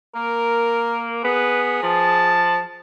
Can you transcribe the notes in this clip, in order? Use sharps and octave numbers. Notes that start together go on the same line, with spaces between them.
A#3 A#4
B3 G#4 B4
F3 A5